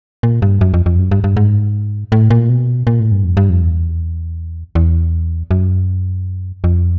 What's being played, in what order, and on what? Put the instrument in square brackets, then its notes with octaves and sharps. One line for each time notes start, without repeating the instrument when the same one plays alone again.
[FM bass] A#2
G2
F#2
F2
F2
F#2
G2
G2
G#2
A2
A#2
B2
A#2
A2
G2
F2
G2
F2
E2
E2
F#2
F2